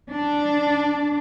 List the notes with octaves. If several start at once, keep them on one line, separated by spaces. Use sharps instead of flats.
D4